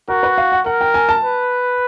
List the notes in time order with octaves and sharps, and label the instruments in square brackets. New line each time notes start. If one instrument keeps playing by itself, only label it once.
[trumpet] F#4 [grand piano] A#4
[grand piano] B4
F5
F#5
[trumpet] A#4 [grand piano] F#5
[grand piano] G5
G#5
A5
[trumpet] B4